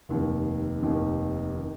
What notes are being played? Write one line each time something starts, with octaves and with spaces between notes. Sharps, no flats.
F1 D#2 D#3
F1 D#2 D#3
D#3